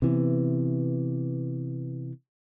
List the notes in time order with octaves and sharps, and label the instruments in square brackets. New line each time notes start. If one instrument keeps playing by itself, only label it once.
[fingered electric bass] C3 E3 B3